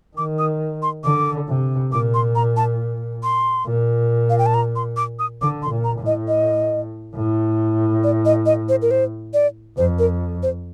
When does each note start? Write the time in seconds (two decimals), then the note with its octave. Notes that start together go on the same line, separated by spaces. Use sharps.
0.17 D#3 D6
0.39 D#6
0.83 C6
1.04 D3 D6
1.48 C3
1.92 A#2 D6
2.14 C6
2.35 A#5
2.57 A5
3.23 C6
3.66 A#2
4.30 F5
4.39 G5
4.46 A5
4.54 A#5
4.76 C6
4.97 D6
5.19 D#6
5.42 D3 D6
5.63 C6
5.70 A#2
5.84 A#5
5.99 A2
6.06 D#5
6.28 D#5
7.16 A2
8.04 D5
8.25 D#5
8.46 D#5
8.69 C5
8.82 A#4
8.91 C5
9.34 D5
9.77 F2 C5
9.99 A#4
10.43 C5